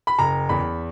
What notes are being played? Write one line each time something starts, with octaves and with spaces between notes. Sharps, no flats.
B5
F#1 A#5
E2 B5